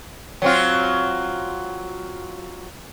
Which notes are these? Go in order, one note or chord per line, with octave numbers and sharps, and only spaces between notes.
F#3 C4 F4